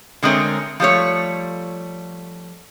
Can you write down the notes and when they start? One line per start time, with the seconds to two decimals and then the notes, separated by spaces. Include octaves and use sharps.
0.23 D3 G#3 A3 C4 A#4 C#5
0.80 F3 G3 A3 C#5